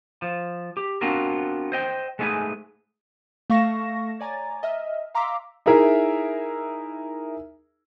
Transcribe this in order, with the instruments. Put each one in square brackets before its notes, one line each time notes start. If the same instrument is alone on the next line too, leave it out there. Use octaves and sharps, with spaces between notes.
[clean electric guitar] F3
G4
B3 C4 D4 F4 F#4 A#4
C5 D#5 G5
G#3 A3 B3 D#4 G#4 B4
[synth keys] A3 F5 C#6 A#6 E7
C#5 D5 G#5 A#5 A6
D#5 E5 F6
F5 A#5 C6 D6 E6 B6
[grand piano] D#4 E4 G#4 A#4 E5